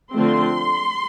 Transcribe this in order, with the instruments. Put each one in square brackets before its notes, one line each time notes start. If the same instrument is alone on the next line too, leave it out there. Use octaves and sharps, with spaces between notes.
[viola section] D3 F3 A3 C4 C6